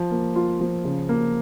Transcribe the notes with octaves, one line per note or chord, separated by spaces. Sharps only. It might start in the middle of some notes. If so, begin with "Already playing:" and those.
Already playing: F3
A#3
F4
F3
C#3
A#3